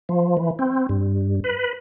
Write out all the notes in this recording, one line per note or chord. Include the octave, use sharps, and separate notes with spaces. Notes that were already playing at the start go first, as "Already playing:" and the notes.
F3
E3
C4
G2
B4